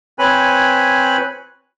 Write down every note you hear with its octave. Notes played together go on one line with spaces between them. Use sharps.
C4 B4 C#5 G#5 B5